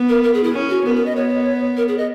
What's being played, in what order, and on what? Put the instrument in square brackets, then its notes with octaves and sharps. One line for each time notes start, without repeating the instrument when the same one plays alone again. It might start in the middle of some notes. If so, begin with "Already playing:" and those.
Already playing: [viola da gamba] B3
[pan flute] A#4
A#4
G#4
E4
[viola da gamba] C#4
[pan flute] F#4
[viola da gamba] B3 [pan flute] A#4
[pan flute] A#4
D#5
[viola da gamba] B3 [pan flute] C#5
[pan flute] A#4
G#4
D#5